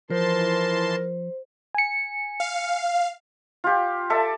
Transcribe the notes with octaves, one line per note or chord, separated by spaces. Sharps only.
E3 F3 A#4 C5 A5 C6
G#5 C#7
F5
F4 G4
A4 D5 E5 A5